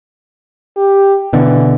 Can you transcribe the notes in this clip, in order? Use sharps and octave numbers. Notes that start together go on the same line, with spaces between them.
G4
B2 D3 E3